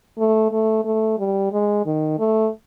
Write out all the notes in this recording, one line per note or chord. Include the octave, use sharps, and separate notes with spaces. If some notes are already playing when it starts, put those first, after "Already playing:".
A3
A3
A3
G3
G#3
D#3
A3